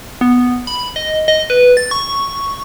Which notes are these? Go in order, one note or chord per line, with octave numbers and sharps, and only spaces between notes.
B3
B5
D#5
D#5
B4
A6
C#6